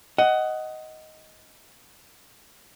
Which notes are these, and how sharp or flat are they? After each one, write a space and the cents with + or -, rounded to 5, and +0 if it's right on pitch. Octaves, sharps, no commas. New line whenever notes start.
D#5 +10 F#5 +15